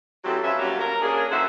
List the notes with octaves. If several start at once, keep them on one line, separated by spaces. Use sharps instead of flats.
E3 F#3 G#3 C4 G4 A4
F3 C#4 B4 E5
D3 F#3 G3 A#3 C#4
A#4
A#3 C#4 D4 G#4
F#2 D3 F#4 C5 E5